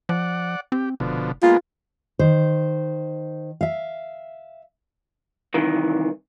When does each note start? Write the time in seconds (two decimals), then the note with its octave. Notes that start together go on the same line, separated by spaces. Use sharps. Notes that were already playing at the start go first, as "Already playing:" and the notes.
0.09 F3 D5 F#5
0.72 C4 G4
1.00 F1 B2 D3 F3
1.43 G#3 A#3 B3 F4
2.19 D#3 C5
3.61 E5 F5
5.54 C2 D#3 E3